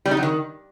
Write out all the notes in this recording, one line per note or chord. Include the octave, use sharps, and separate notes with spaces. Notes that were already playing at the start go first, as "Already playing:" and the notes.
G3
D#4
F#3
D#3